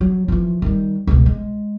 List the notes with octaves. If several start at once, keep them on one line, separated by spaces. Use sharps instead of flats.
F#3
E3 F3
D#3 G3
C#2 B2
G#3